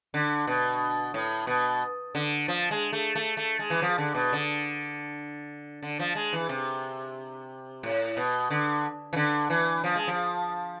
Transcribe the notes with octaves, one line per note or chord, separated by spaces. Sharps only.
D3
B2
A2
B2
D3
F3
G#3
A3
A3
A3
G#3
E3
F3
D3
B2
D3
D3
F3
G#3
E3
C3
A2
B2
D3
E3
D3
E3
F3
G#3
F3